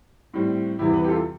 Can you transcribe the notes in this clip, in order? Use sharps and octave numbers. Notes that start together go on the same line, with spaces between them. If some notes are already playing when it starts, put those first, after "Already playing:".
A2 G3 C4
E2 C3 E3 G3 E4 G4
G4 B4
G4
F4 A4